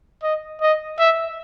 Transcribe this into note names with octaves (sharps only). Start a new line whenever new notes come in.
D#5
D#5
E5